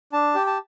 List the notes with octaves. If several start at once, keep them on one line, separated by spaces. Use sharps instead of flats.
D4 A5
G4
A5